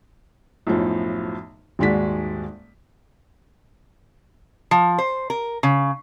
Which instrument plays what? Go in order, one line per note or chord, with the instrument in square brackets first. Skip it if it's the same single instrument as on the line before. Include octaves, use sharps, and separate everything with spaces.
[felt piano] B1 F#2 A2 F3
D#1 G#2 G#3 F#4 D5 B6
[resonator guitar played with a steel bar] F3
C5
A#4
C#3